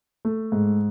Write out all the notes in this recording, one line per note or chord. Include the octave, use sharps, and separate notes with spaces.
A3
G#2